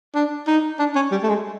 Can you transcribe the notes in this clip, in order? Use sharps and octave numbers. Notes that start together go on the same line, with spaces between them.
D4
D#4
D4
C#4
G3
A3
G#3